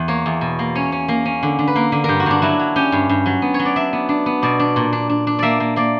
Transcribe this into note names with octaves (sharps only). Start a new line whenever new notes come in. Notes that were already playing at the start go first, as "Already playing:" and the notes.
Already playing: E2
A#3 C#5
E2
B2
A#3
C#4 C#5
C#4
A#3 A#4
C#4
D3
D3
B4
A#3 A#4
D3
G2 G4 A#4
F#4
G2 D4
F#3 E4
F#3
C#4 G4
G2
G2
F#3
B3
C#5
F#3
D5
D4 E5
B3
D4
B3
B2 D5
D4
A#2
D4
D4
D4
A#3 D5 E5
A#3
A#3 D5